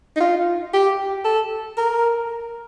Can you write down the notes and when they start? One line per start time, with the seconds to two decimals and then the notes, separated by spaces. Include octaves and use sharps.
0.17 D#4
0.21 F4
0.74 G4
1.25 A4
1.78 A#4